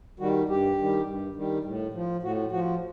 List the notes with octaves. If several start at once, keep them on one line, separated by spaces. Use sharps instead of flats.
D#3 G3 F#4
G2 G4
D#3 G3
G2
D#3 G3
A2
F3
A2 F#4
F3 F#4